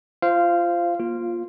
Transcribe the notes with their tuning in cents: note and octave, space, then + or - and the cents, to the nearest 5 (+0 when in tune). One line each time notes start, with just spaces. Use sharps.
F4 -20 C5 +0 F5 -15
A#3 +25 F4 +0